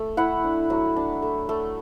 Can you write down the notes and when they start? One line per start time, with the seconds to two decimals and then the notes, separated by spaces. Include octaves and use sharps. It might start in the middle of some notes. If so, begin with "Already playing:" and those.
Already playing: A3
0.17 E4 F#5
0.44 D4
0.70 F#3
0.96 D4
1.22 A3
1.49 A3